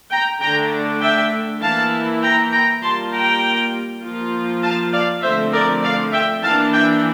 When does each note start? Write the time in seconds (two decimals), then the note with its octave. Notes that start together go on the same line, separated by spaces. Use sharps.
0.11 G5 A#5
0.42 D3 A3 D4 G5 A#5
1.01 E5 G5
1.62 E3 A#3 E4 F5 A5
2.23 G5 A#5
2.52 G5 A#5
2.82 G3 A#3 F4 A5 C6
3.12 G5 A#5
4.03 F3 A#3 F4
4.63 F5 A5
4.92 D5 F5
5.22 D3 F3 A3 C4 C5 E5
5.53 A#4 D5
5.83 D5 F5
6.12 E5 G5
6.43 E3 A#3 D4 F5 A5
6.73 E5 G5